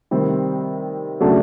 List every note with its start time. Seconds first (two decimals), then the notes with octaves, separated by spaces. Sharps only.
0.11 C3 D#3 G3 C4
1.21 C#3 F#3 A3 D4